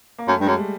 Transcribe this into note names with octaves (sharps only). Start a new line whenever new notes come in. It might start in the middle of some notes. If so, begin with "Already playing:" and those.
A#3
F#2 A3
G2
F#2 G#3
G3